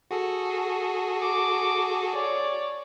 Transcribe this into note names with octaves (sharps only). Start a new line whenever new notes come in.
F#4 G#4 A4
D6
C#5 D5